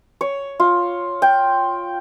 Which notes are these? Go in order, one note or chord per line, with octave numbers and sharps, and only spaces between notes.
C#5
F4
G5